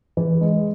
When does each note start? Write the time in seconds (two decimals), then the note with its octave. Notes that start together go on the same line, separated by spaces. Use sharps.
0.17 E3
0.41 G#3